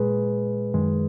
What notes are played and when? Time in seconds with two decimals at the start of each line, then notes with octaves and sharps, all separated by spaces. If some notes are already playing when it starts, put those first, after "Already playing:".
Already playing: A#2 G#3 G#4 B4
0.74 F#2 D#3 G#3